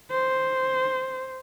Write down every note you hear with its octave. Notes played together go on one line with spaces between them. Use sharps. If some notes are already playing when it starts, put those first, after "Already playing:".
C5